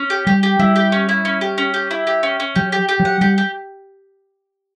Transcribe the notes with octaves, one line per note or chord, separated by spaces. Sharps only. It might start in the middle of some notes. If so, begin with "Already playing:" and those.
Already playing: C#4
G4
G3 G4
G4
G3 E4
G4
C#4
E4
C#4
G4
C#4
G4
E4
G4
C#4
C#4
F#3 G4
G4
G4
F#3
F#5
G3 G4
G4